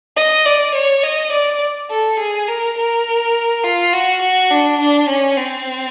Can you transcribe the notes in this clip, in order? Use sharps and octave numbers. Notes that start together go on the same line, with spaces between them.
D#5
D5
C#5
D#5
D5
A4
G#4
A#4
A#4
F4
F#4
F#4
D4
D4
C#4
C4